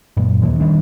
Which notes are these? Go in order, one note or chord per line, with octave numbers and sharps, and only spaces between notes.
F#2 A#2
D#2 A#2 E3
D#3 G3 A#3 D4